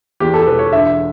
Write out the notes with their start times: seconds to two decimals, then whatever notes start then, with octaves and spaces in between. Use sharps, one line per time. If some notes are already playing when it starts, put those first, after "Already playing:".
0.20 E2 G4
0.34 A4
0.46 E1 B4
0.59 C#5
0.72 D3 E5